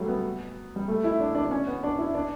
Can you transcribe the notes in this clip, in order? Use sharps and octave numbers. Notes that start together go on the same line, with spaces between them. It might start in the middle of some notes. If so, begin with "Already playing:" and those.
Already playing: F#3 G3 A3
B3
G3
A3
E4
D4
D4
D4
C#4
B3
D4
E4
D4